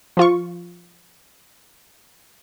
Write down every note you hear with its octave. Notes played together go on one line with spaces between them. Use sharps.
F3 F4 C#6